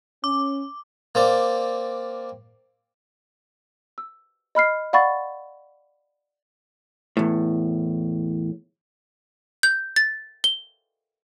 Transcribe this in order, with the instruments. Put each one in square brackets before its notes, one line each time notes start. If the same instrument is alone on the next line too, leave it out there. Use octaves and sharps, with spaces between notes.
[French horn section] C#4 [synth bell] D6
[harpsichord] A#3 C4 D5
[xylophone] E6
D#5 B5 F6 C7
D5 F5 F#5 B5 C#6 A6
[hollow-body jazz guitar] E2 A2
[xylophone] G6
A6
G7